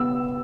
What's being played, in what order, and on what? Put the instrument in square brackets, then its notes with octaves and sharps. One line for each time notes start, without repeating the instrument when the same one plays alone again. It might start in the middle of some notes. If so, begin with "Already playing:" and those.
Already playing: [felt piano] B3 E6